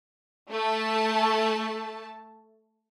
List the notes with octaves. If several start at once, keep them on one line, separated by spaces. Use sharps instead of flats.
A3 A5